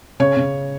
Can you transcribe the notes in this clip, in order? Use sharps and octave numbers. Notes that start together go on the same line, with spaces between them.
C#3 C#5
C#3